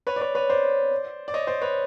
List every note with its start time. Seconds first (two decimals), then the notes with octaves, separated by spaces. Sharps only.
0.07 B4 C#5
0.16 D5
0.21 B4 C#5
0.35 B4 C#5
0.49 C5 D5
1.28 D5
1.34 C#5 D#5
1.47 C5 D5
1.62 B4 C#5